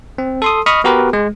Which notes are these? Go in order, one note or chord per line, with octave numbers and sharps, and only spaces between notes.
C4
A4 C6 D#6
D#5 B5 C#6 D#6 F6
B3 F#4 G4 A#4 B4
G#3